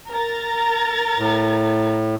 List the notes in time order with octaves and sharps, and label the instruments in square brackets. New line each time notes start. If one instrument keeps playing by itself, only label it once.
[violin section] A#4 A#5 A6
[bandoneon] A2